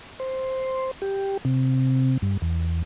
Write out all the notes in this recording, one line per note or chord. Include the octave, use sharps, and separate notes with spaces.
C5
G4
C3
G2
E2